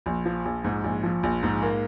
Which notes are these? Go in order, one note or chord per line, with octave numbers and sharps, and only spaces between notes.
A#1
F3
A#1
G#2
A#1
F3
A#1
G#2
A#3